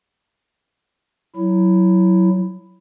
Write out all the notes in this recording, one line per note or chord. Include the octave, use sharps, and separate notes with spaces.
F#3 E4